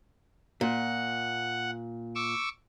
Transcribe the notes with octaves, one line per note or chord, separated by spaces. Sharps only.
A#2 F#5
C#6 D6 E6